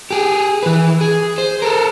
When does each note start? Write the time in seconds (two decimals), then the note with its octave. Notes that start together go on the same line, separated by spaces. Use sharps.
0.11 G4 G#4
0.63 E3 B4
1.01 G#4
1.38 C5
1.62 A4 A#4